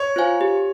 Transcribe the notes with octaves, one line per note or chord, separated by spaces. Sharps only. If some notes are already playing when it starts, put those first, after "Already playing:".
Already playing: C#5
F4 C5 F5 G#5
G4